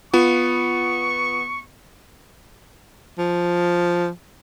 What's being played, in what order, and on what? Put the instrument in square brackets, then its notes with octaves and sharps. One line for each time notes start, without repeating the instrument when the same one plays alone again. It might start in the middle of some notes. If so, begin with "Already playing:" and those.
[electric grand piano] B3 [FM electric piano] F4 [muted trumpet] C#6
[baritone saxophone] F3